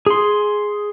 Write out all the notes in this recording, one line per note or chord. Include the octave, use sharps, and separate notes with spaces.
G#4 C6